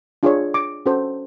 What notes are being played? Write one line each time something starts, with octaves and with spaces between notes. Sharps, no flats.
D4 F4 G#4 C#5
D6
C#4 F#4 A4 C5